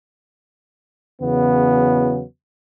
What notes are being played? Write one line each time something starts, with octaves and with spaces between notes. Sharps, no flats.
E2 C#3 E3 F#3 B3